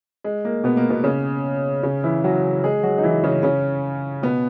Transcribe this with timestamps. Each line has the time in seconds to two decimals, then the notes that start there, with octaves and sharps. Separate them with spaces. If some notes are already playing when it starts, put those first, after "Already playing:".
0.24 G#3
0.45 A#3
0.64 B2 B3
0.77 A#3
0.90 B2 B3
1.04 C#3 C#4
1.83 C#3 C#4
2.04 E3 E4
2.24 F#3 F#4
2.64 G#3 G#4
2.83 F#3 F#4
2.98 D#4
3.03 E3 E4
3.23 C#3 C#4
3.43 C#3 C#4
4.22 B2 B3